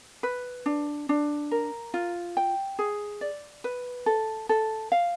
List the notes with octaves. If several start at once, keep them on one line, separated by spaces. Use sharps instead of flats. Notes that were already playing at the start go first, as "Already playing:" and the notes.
B4
D4
D4
A#4
F4
G5
G#4
D5
B4
A4
A4
F5